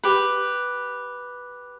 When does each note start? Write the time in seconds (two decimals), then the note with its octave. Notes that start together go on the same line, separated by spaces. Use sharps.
0.03 G4 B4